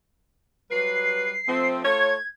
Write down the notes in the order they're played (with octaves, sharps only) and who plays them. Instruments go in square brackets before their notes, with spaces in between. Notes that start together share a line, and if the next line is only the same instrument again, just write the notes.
[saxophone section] F#3 G3 B4 [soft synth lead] C7
[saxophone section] F3 A3 C4
[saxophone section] A3 F4 C#5 [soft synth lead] G#6